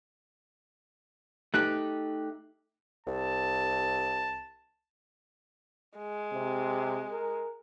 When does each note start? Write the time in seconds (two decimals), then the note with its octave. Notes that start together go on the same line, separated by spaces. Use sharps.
1.54 A3 D#4 G4 F#6
3.07 C2 A5
5.98 G#3
6.32 C3
7.11 A#4